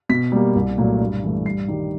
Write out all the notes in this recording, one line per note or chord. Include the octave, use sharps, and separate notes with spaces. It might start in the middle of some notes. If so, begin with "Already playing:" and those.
B2 B6
G3 A#3
C2
A#2 F#3 A3
G2
E3 A3
G2 C7
D#3 G3